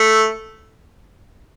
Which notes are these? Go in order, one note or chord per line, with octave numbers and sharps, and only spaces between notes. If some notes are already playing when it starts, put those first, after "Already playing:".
Already playing: A3